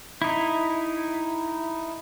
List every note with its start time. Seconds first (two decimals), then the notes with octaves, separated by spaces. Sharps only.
0.22 D#4 E4